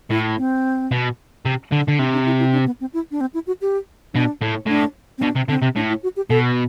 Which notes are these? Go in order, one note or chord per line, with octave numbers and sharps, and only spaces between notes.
A2 E4
C4
B2
C3
D3
D3
C3 D4
D4
E4
E4
D4
B3
C4
E4
D4
C4
E4
F#4
G4
B2 D4
A2
A2 D4
C4
B2 D4
C3
D3 C4
C3
A2 D4
E4
F#4
G4
B2 A4